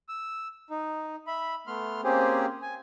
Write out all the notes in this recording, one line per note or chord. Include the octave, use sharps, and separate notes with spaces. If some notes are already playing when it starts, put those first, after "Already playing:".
E6
D#4
E5 B5
A3 B3 C6 F6
A#3 C4 C#4 G4 G#4 C5
G#5